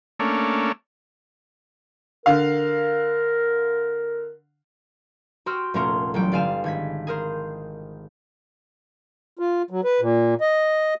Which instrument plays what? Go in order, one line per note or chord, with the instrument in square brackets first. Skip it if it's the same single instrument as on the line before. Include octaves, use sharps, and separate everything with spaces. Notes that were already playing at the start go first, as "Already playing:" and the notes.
[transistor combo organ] A3 A#3 C#4 D4
[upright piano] D3 F5 [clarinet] A#4
[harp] F#4 C5 G5 C6 E6 F6
F1 A#2 A3 C#4 A#4 C6
A1 F#3 G3 G5
G1 D5 F5 G#5 E7
G#1 G#6 B6
G#4 A#4 C5
[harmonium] F4
F#3
B4
A#2
D#5